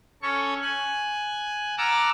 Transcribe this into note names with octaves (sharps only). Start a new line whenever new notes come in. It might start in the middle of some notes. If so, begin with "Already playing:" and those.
C#4 A4 C#5 C#6
G#5 F#6
F#5 A5 A#5 D6 E6 F6